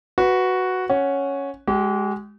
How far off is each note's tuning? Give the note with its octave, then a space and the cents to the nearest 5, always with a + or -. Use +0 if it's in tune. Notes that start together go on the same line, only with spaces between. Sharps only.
F#4 +0 B4 +0
C#4 +0 F#5 +0
G#3 +0 G4 -40